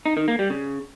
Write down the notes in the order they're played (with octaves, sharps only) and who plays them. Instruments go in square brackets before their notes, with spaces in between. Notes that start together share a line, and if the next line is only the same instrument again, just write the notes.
[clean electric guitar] D#4
D#3
A#3
G3
C#3